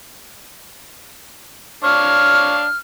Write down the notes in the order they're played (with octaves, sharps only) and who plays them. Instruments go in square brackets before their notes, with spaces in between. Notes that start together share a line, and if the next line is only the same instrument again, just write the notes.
[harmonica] D4 C#5 F5 [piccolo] F6